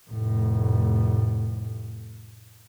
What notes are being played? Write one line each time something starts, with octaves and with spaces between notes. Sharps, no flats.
F1 A2